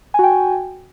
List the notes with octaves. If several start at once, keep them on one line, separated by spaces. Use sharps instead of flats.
F#4 G5 G#5